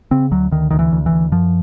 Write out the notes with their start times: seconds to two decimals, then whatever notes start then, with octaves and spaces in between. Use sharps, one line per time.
0.11 C#3 C4
0.31 D2 F#3
0.51 D2 D#3
0.71 D2 D#3
0.79 E3
0.92 D2
1.06 E3
1.12 D2
1.32 F#2 F3